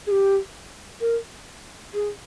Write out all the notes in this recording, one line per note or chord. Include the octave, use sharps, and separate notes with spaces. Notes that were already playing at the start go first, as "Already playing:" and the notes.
G#4
G4
A#4
G#4